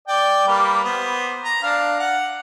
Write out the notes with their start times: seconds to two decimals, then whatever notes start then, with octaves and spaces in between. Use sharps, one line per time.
0.08 D5 G5
0.48 G3 A#3 B4
0.84 B3 C5
1.44 A#5
1.63 D4 F5
2.00 F#5